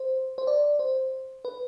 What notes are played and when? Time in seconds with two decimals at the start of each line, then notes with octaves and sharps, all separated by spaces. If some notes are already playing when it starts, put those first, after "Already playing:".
Already playing: C5
0.38 C5
0.47 D5
0.79 C5
1.45 B4